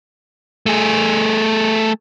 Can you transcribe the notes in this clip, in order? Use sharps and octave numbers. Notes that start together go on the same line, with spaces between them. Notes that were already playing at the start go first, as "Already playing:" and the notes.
A3 G#4